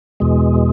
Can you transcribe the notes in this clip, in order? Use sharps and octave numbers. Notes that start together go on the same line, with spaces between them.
E2 B2 G#3